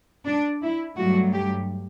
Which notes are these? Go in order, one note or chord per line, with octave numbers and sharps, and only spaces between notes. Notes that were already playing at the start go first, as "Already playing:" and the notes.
D4
E4
G2 F#3 A3 F#4
G4